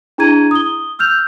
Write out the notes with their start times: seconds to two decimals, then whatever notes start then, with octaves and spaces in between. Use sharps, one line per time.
0.18 D4 E4 G#4 A#5 G#6 D#7
0.51 D#6 G7
0.99 E6 F6 G6 F7